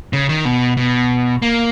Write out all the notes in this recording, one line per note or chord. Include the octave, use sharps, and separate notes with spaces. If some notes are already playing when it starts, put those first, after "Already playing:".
C#3
D#3
B2
B2
A#3